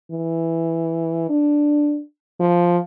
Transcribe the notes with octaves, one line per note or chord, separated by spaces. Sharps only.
E3
D4
F3